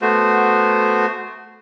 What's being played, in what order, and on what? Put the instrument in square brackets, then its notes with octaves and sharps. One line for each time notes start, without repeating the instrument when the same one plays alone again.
[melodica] A3 B3 F#4 C5